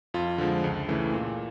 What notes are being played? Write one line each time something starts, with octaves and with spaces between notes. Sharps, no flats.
F2 F4
D3 F3 G#3
C#2
C#3 E3 A3
A#2